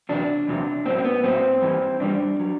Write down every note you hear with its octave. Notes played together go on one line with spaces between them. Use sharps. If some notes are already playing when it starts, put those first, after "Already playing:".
E2 C3 F#3 D4
E2 C3 F#3
A2 F#3 C4
C4
B3
A2 F#3 C4
G2 E3 G3
G2 E3 G3 D4
F#3